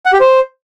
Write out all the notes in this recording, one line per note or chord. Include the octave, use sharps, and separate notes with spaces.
F#5
G4
C5